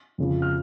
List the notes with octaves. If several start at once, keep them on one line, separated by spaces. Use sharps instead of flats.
F2 C#3 F3
F6